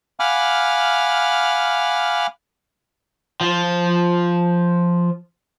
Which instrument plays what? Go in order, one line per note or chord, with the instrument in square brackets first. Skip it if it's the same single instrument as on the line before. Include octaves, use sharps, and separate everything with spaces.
[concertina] F5 F#5 G#5 B5 D6 F6
[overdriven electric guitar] F3 F4